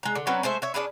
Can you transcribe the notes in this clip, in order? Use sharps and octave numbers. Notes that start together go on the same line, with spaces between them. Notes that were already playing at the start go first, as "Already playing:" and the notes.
G#3 A#5
D3
F#3 C4 C#4 B4
G#3 A3 C5 E5
C#5 E5
C#4 D4 G#4 B4